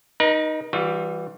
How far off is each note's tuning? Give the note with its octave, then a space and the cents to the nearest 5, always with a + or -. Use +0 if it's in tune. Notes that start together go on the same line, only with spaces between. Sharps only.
D#4 +0 A#4 +45
E3 -15 G3 +0 F4 +45